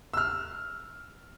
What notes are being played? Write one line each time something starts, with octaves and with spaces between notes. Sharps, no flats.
E6 F6